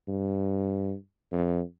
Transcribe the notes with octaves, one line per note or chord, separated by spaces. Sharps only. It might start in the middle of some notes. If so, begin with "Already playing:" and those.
G2
F2